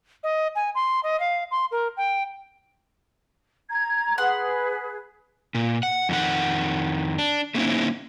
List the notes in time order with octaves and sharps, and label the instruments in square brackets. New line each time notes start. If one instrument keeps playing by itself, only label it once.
[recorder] D#5
G#5
C6
D#5
F5
C6
A#4
G5
[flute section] A#5 G#6
[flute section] G#4 B4 [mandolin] F#5 C6
[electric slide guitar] A#2
F#5
F2 D#3 F#5
D4
A3 A#3 C4 C#4 D#4 E4